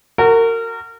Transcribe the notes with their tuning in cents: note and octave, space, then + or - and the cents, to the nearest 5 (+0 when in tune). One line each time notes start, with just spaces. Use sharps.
F#4 +0 A#4 -30